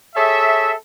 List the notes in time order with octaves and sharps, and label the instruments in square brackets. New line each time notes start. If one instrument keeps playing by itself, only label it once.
[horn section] G#4 A4 C#5 E5